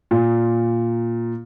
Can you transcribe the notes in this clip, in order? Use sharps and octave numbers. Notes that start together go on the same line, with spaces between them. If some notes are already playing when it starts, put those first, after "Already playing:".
A#2